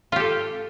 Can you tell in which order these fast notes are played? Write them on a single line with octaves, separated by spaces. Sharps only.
F4 G4 A4